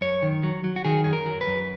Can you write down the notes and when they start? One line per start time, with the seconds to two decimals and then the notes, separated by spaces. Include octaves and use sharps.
0.01 F#2 C#5
0.22 D#3
0.43 F#3
0.64 F#3
0.76 F#4
0.85 D#3 G#4
1.04 F#2 G#4
1.13 A#4
1.26 F#3
1.41 B4
1.47 F#2